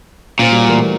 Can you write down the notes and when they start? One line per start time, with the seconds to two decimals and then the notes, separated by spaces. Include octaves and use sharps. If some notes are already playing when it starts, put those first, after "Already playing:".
0.39 A#2 C#4 C5
0.52 G3 F#4
0.69 E3 A3 A#4